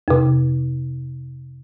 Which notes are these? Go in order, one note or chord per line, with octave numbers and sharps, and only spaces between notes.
F2 C3